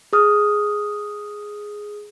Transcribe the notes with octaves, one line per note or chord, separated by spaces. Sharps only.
G#4 D#6 F6